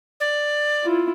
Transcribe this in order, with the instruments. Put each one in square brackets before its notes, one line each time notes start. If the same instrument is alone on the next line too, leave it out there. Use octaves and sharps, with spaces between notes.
[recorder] D5
[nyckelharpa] E4 F4